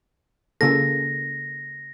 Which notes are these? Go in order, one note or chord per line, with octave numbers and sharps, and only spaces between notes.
C#3 A#3 A4 A#6